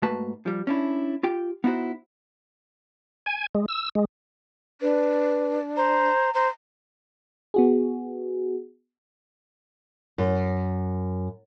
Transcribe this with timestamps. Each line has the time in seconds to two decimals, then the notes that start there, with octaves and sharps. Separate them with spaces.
0.02 G#2 A3 A#3 F#4 B4 A5
0.46 F3 G3
0.67 C#4 D4 E4
1.23 F4 G4 G5
1.64 B3 D#4 E4 F#4 C5
3.26 G#5
3.55 G#3
3.68 E6
3.95 G#3
4.81 D4 B4
5.77 C5 A#5
6.35 C5 A#5
7.54 B3 F#4 G#4
10.18 F#2